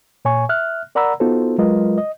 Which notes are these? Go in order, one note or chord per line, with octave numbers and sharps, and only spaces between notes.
A#2 C#5 G#5 C#6
E5 F6 F#6
A#4 D5 F#5 A#5 B5 E6
B3 D#4 F4 F#4 A4 C5
F#3 G#3 F4 A#4 B4 D#5
D#5